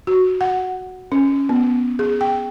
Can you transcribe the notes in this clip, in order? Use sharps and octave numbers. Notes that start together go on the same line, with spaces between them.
F#4
F#5
C#4
B3
G#4
G5